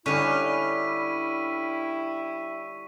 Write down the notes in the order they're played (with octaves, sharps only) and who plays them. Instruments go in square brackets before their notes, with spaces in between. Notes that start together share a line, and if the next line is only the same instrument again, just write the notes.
[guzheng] D3 D#4 [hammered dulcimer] G3 C#4 [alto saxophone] E4 [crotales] C#6 B6 D#7